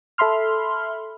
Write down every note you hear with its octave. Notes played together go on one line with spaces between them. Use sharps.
A4 E5 B5 C6 F6